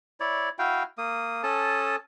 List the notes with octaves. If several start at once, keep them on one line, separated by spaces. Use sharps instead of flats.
E4 C#5 D5
E4 F#4 F5 G5
A#3 D#6
C#4 A4 A5 D#6